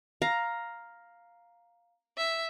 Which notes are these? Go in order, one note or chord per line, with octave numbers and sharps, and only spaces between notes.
F5 A#5
E5